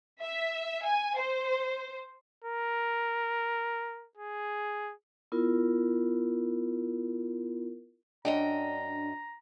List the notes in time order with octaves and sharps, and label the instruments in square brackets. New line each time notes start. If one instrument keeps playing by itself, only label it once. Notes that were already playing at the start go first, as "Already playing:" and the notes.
[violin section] E5
G#5
C5
[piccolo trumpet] A#4
G#4
[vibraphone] B3 E4 F4 A#4
[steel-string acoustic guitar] F#2 D#5 G5 [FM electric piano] D4 [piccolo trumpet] A#5